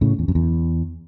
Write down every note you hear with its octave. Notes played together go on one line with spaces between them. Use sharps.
A2 C#3
E2
F#2
E2